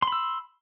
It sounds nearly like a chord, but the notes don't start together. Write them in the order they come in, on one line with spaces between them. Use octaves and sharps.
C6 B5 E6